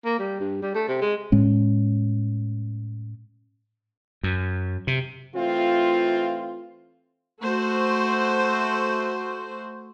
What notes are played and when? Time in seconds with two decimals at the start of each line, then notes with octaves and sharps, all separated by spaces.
0.05 A#3
0.19 G3
0.40 G2
0.62 G3
0.75 A3
0.88 C3
1.01 G#3
1.32 A2 G#3 C#4
4.23 F#2
4.87 C3
5.35 E3 A3 C4 F4
7.41 A3 F#4 C5